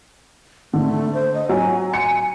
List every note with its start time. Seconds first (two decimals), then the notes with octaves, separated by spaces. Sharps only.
0.73 D3 A3
1.14 C5
1.34 D#5
1.49 F#3 G#5
1.94 G#5 C#7